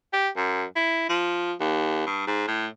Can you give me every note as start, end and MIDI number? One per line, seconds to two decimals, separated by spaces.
0.13 0.28 67
0.37 0.64 42
0.76 1.09 64
1.09 1.52 53
1.60 2.03 39
2.06 2.24 43
2.27 2.47 44
2.48 2.66 45